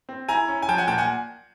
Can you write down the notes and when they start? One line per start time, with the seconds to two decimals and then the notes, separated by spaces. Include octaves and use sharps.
0.09 C4
0.29 E4 G#5 A#5
0.48 C#4
0.62 G#5
0.68 F3 G5 A5
0.78 F#5 G#5
0.88 A#2 G5 A5
0.98 F#5 G#5